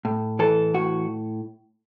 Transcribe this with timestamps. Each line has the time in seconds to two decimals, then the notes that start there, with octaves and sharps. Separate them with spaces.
0.05 A2
0.39 E3 A4
0.74 A2 F#4